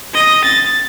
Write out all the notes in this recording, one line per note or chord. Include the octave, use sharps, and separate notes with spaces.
D#5
A6